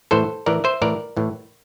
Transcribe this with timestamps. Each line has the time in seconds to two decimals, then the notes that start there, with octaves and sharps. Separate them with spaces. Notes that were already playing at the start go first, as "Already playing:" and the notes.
0.11 A2 E3 A4 C5
0.46 A2 E3 A#4 D5
0.64 C5 E5
0.82 A2 E3 A#4 D5
1.17 A2 E3